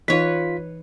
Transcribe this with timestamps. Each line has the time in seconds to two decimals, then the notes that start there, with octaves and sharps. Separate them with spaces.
0.08 E3 D#4 F4 B4 C#5 B6